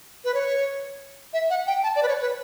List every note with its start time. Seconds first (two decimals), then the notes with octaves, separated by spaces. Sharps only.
0.25 B4
0.34 C#5
1.33 E5
1.50 F#5
1.67 G5
1.83 A5
1.96 D5
2.03 B4
2.08 C#5
2.21 B4